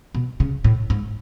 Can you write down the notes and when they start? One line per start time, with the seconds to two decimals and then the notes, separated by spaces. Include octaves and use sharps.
0.15 B2
0.40 C#3
0.64 A2
0.90 G#2